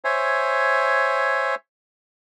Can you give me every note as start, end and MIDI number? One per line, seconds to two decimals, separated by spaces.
0.04 1.55 72
0.04 1.55 73
0.04 1.55 76
0.04 1.55 80